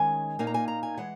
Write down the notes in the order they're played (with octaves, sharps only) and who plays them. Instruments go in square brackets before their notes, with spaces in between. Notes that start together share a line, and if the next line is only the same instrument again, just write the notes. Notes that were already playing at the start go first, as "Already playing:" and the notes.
Already playing: [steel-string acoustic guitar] D#3 G#3 C#4 G#5
A#2 A#3 D#4 G#5
A#5
G#5
A#5
G#5
E3 G#3 F#5